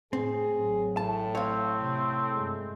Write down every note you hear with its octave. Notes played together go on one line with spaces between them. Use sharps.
A2 C4 G#4
A1 F#3
A2 A5
C4 C#5 F5
C3
G2 G#3